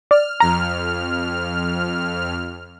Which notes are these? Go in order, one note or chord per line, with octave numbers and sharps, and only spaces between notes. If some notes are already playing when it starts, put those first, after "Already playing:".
D5 F6
F2 A#5 F6